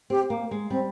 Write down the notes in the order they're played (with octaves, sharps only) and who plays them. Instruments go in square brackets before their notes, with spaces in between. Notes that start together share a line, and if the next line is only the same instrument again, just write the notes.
[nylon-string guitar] C4 [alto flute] G4
[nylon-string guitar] A#3
G#3
[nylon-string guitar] G3 [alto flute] C4